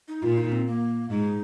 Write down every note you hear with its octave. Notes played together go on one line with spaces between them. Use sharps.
D#4
A#2 F4
D#4
C4
A#3
G#2 D#4